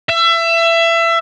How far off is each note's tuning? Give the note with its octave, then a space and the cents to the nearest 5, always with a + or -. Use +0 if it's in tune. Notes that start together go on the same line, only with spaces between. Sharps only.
E5 +25